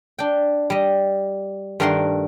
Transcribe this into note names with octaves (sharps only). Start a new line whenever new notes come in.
D4 G5
G3 D#5
G2 D#3 A3 A#4 F#5 C6